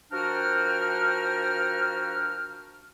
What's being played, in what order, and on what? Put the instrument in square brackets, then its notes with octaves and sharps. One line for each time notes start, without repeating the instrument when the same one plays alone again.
[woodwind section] F3 D4 F#4 A#4 G5 F6